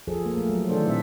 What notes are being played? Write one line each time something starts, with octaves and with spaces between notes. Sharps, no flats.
F3 G#4 A4
A#3
A3
F#3
D#3 E3 A3 D4 A4 C5
A#2 A3 C4 E5